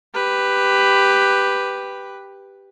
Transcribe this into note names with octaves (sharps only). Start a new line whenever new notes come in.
G4 B4